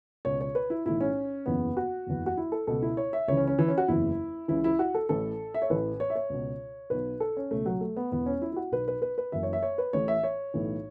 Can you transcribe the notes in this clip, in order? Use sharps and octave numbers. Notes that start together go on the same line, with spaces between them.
C#2 B2 C#5
C#5
B4
E4
B1 A2 E3 E4
C#4
F#1 E2 C#3 E3 B3
F#4
F#1 E2 E3
F#4
E4
A4
C#2 B2 A4
E4
C#5
E5
C#2 C#3 E3 C#5
C#4
C#4
E3
C#4
F#4
F#1 E2 C#3 E3 E4
C#2 C#3 E3 E4
E4
F#4
A4
A1 A2 E3 A4
E5
C#5
A1 A2 E3 B4
C#5
E5
C#5
C#2 B2
B1 B2 B4
A4
C#4
C#2 B2 A3
F#3
A3
B3
E1 E2 E3 B3
C#4
E4
E4
F#4
B1 B2 B4
B4
B4
B4
F#1 F#2 E3 E5
C#5
E5
C#5
B4
A1 A2 E3 C#5
E5
C#5
B1 A2 E3